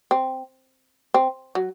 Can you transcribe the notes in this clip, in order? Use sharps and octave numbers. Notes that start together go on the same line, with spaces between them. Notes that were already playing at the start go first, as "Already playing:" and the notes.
C4
C4
F#3